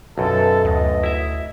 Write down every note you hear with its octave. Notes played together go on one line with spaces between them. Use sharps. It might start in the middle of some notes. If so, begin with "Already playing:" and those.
B1 F#2 A4
D2 D#5
E4 E5